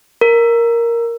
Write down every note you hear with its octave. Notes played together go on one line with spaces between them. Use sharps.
A#4